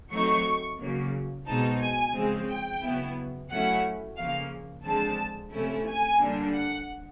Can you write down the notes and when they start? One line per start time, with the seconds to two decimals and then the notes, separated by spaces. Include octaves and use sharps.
0.12 F#3 A3 C4 D#4 C#6
0.80 C#3 F#3 A#3
1.47 B2 G#3 C4 D#4 A5
1.80 G#5
2.14 C#3 F3 G#3 C4
2.49 G5
2.81 C#3 F#3 B3 E4
3.50 F#3 A3 C#4 E4 F#5
4.17 C#3 F3 A#3 F5
4.84 D3 F3 G#3 C4 A5
5.52 C3 F3 A3 C#4 E4
5.86 G#5
6.20 D3 G3 A#3 D4
6.54 F#5